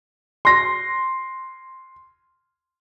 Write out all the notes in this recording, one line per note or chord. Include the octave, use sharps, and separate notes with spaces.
C6 A#6